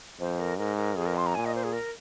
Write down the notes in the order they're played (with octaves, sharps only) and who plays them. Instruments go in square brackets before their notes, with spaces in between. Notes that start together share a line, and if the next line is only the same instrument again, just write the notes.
[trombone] F2 [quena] C5
[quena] A#4
[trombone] G#2 [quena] A#4
[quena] A#4
[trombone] F2 [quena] G#4
[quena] A#4
C6
A#5
[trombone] A#2 [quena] G#5
[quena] D#5
C5
G#4
A#4